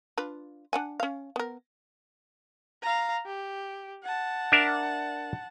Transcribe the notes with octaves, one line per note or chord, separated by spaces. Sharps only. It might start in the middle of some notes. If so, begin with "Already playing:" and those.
D4 F4 B4
D4 F#5 G#5
C#4 F5
B3 A#4
F5 A#5
G4
F#5 A5
D4 A#4 E5